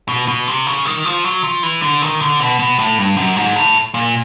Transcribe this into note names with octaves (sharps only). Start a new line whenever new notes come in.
B2
B2
C3
C#3
D#3
F3
F#3
F3
E3
D3
D#3
D3
B2
B2
A2
G2
F#2
G#2
A2
A#2